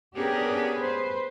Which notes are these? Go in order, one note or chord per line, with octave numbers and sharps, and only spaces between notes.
B3 C#4 D4 G4 G#4 A#4
B4 C5